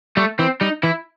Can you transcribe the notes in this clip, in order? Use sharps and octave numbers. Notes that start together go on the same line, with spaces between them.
G3 A3
E3 C4
G3 D#4
E3 E4